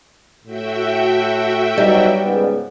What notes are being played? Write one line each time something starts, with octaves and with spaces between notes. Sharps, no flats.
A2 F#4 E5 G5
F#3 G3 B3 D#4
C#2 G#2 B3